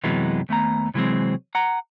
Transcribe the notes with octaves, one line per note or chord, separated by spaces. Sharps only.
F#2 C3 E3 F#3 G#3 B3
D#2 A3 B3 A#5
C3 E3 F#3 G#3 C4
F#5 A#5